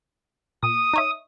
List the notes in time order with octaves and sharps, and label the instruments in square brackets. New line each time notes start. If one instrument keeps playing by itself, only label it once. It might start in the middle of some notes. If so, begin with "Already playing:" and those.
[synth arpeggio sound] A#2 [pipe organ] D#6
[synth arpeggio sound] D#4 C#5 E5